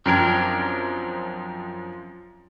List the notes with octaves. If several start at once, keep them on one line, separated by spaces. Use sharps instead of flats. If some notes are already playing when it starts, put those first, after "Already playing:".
F#2 F3 C4 D4 A#4 G#6